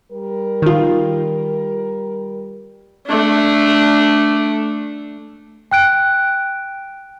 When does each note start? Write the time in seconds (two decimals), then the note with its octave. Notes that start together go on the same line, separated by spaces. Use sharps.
0.12 G3 A#4
0.62 D#3 F4
3.07 A3 D4
5.71 G5 F#6 D7